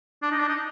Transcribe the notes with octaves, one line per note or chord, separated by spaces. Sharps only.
D4
D#4
D4
D#4